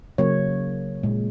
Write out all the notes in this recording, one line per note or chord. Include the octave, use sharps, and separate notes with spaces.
C#3 F#3 A#3 C#5
A#2 G#3